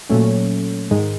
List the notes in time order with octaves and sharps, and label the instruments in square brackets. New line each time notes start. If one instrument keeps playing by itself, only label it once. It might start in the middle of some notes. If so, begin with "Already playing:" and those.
[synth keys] A#2 F#3 A3 C#4
G#2 D#3 G#3